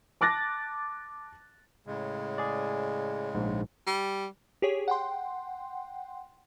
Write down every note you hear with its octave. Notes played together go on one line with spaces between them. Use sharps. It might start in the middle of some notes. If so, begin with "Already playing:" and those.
A5 D6 F#6 A6 A#6
A2 C#3 G#3
G#4 D5
A#1 G#2
G3
G4 G#4 C#5
F#5 G5 C6